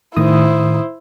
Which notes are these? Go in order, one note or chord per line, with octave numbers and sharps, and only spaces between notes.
A2 D#3 E4 C5 D#6